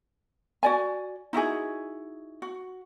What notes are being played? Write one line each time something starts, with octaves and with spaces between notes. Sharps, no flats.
F#4 D5 G#5
D#4 E4 F#4 G#4
F#4